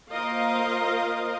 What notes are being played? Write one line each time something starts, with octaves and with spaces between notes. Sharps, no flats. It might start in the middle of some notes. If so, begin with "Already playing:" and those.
A#3 F4 A#4 C5 D#5 F5